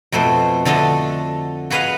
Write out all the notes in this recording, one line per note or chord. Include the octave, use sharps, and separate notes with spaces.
F2 B2 A3 C5
D3 A3 D4 A4 D#5
F#4 G#4 B4 D#5 F5 F#5